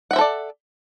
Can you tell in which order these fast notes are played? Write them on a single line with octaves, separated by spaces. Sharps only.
F#5 E5 C5 A4 D5